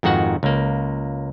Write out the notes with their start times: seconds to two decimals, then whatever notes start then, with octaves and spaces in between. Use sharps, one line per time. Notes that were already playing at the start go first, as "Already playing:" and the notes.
0.03 F2 G#2 D#3 F#4 F#5
0.43 C#2 A#3